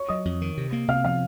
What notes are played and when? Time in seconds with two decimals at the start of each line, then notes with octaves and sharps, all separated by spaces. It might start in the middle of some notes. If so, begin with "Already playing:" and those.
Already playing: C#5 C#6
0.09 F#3 D#5 D#6
0.25 F2
0.41 D#3
0.57 C3
0.72 A#3
0.88 C3 F5 F6
1.05 F3 F5 F6